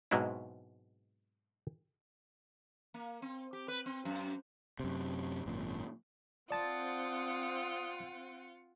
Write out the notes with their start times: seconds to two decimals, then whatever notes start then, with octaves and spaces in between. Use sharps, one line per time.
0.11 G#2 B2 F#3 G#3 C4 E4
2.94 A#3
3.22 C4
3.53 G4
3.68 B4
3.86 C4
4.05 F#2
4.80 F#2 C3
5.46 G#1 F#2 A#2
6.51 C4 F4 D5 F#5 A5 D#6 A6 C#7